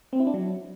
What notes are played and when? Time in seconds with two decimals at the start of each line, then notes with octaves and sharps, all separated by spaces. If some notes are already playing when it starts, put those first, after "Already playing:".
0.13 C4
0.20 E4
0.27 D4
0.34 F#3